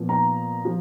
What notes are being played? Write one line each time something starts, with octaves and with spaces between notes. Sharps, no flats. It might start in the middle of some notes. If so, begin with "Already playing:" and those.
Already playing: A#2 F3 B3
A#5
F3